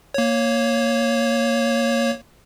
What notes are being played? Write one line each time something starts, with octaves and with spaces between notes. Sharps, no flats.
A#3 C#5